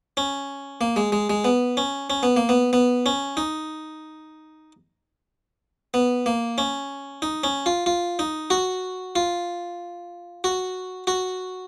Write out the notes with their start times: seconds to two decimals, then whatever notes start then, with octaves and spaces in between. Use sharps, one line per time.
0.17 C#4
0.81 A#3
0.96 G#3
1.12 G#3
1.30 G#3
1.44 B3
1.77 C#4
2.10 C#4
2.23 B3
2.37 A#3
2.49 B3
2.73 B3
3.06 C#4
3.37 D#4
5.94 B3
6.26 A#3
6.58 C#4
7.22 D#4
7.44 C#4
7.66 F4
7.86 F4
8.19 D#4
8.50 F#4
9.16 F4
10.44 F#4
11.07 F#4